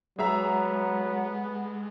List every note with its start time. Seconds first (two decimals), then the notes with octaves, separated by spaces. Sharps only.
0.19 F#3 G#3 B3 G#4 E5 A#5